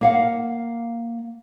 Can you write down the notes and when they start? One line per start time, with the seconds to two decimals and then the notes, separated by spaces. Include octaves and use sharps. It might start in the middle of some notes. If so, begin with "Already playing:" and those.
0.01 A#3 F5 F#5